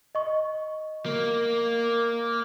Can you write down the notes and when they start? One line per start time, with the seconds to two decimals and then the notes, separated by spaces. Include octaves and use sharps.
0.15 D#5 C#6
1.06 A#3